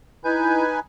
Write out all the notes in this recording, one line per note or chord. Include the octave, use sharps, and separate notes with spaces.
D#4 E4 B4 G#5 G6